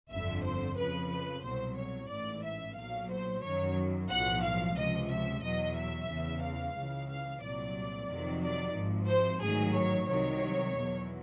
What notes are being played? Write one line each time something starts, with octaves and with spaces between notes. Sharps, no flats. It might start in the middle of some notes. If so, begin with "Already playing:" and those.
G1 F2 D3 E5
C5
F2 C#3 F3 B4
B4
C2 B2 F#3 C5
C#5
A1 G#2 E3 D5
E5
B1 A#2 F#3 F5
C5
F#2 D#3 F#3 C#5
B1 A2 F3 F#5
F5
C#2 C3 F3 D#5
E5
E2 B2 F#3 D#5
E5
E2 C#3 E3
F5
C#2 C#3 E3
F5
C2 A#2 F#3 D5
F2 C3 D#3 F#3
D5
G#1 G#2 F3
C5
A1 G#2 D#3 F#3 G#4
C#5
C2 C3 D#3 F#3 C#5
E2 B2 F#3